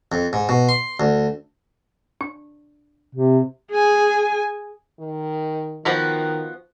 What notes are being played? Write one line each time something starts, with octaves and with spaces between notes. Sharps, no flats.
F2
G#2
B2
C6
D2
D4
C3
G#4 G#5
D#3
D#3 F3 B3 F#4